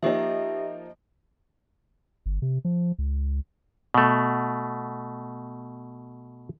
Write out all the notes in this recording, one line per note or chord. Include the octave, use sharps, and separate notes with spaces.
F3 A#3 D#4 G4 E5
G1
C3
F3
C#2
B2 A3